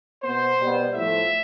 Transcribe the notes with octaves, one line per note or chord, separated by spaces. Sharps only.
B2 B3 C5
B2 G3 B3
A2 F3 A3 E5